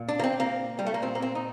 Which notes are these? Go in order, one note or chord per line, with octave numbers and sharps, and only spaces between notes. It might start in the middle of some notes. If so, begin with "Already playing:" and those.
Already playing: A#2
D4
A#3
C4
A#3
G3
A3
A#3
A#2 C4
A#3
C4
D#4